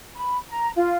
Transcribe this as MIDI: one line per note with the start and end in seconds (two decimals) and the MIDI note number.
0.16 0.37 83
0.50 0.70 82
0.76 0.97 65